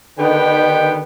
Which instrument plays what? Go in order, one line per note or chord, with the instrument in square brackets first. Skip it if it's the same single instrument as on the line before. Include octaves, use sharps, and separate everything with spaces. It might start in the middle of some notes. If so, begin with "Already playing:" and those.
[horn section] D3 D#3 B4 [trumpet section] B3 G4 G5